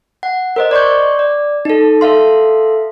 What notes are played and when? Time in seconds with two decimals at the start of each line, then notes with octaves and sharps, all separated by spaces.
0.23 F#5
0.56 A#4 C5 D#5
0.71 D5 C6 C#6 G6
1.19 D5
1.65 D#4 A4
2.01 A4 E5 F5 C6